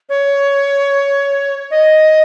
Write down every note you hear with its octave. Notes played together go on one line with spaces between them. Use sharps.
C#5
D#5